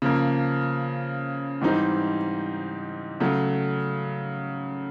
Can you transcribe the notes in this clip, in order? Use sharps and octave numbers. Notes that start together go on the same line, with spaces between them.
C#3 F3 A#3
G#2 E3 G3 C4 D#4
C#3 F#3 A3